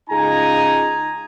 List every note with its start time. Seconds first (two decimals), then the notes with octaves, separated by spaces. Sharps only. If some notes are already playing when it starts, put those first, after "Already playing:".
0.10 C#2 D#4 F4 G#4 G#5 A#5